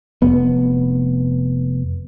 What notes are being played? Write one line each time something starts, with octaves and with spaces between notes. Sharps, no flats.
F1 B3